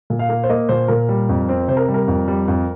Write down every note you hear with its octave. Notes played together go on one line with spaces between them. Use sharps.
A#2
F5
A#3
C5
A#3 D#5
A#2 C5
A#2 A#4
G3
F2
C4
C3 C5
A#4
G3
A#4
F2
G3
F2